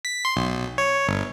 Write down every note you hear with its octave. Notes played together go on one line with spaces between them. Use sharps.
B6
C6
B1
C#5
G1